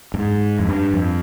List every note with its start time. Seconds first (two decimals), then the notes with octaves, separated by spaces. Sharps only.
0.14 G2
0.18 G#2
0.59 F2
0.69 G2
0.93 F2